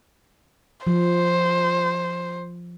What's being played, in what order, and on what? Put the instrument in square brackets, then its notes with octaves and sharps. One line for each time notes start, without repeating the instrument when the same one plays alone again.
[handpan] F3 [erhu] C5